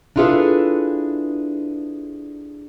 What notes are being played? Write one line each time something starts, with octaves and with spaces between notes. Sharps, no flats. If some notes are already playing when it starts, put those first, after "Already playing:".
D4 E4 F4 G#4 A4 B4